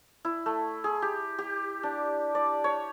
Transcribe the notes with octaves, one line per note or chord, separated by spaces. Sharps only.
E4
A3
G#4
G4
G4
D4
D5
C#5